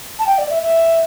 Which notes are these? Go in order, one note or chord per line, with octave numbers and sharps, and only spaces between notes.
A5
G5
D5
E5
E5